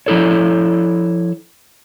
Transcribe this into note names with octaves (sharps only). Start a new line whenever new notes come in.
F3 E4 A4 C#5